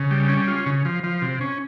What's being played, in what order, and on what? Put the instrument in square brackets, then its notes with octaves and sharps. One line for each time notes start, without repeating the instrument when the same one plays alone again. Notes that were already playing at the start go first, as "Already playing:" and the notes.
Already playing: [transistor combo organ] C#3
G3
C#4
F4
C#3
F3
F3
C3
C#4